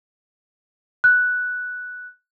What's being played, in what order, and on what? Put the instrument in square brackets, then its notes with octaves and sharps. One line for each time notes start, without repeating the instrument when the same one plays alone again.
[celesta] F#6